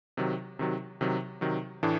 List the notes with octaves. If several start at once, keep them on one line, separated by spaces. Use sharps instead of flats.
C3 D#3 F#3
C3 D#3 F#3
C3 D#3 F#3
C3 D#3 F#3
A2 E3 A3 D4